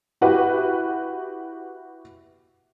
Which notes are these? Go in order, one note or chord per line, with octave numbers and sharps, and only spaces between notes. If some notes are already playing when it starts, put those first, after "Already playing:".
E4 F#4 G4 B4